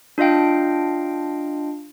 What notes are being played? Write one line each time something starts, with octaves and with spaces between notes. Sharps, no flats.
D4 F4 D#5 F5 G5